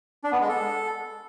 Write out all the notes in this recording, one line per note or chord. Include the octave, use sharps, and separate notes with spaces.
D4
B3
G#3
A4